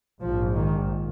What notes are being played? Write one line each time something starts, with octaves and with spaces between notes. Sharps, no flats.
A#1 G#2 F3
D#3